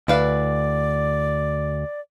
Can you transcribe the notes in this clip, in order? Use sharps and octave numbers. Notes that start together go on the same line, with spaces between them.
D2 E4 B4 D5 F5